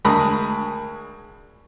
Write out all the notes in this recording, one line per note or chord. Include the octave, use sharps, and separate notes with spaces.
D2 G#3 G#4 A#4 B5 D#6